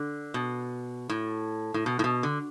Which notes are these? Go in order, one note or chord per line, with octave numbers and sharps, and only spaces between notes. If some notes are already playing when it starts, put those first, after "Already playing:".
Already playing: D3
B2
A2
A2
B2
A2
B2
D3